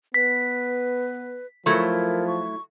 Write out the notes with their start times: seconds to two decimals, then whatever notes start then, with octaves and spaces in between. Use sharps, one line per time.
0.14 B3 B4 B6
1.66 F3 F#3 A3 E4 A#4
2.27 C#6